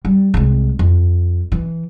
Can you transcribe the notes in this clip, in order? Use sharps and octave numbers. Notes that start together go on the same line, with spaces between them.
G3
C2 G#3
F2
E3